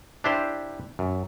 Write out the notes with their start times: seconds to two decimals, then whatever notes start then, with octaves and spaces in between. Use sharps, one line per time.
0.24 D4 E4 G4 C5 D5
0.99 F#2